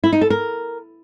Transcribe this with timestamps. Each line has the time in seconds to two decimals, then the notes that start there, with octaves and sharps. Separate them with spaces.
0.04 E4
0.12 D#4
0.21 A4
0.30 A#4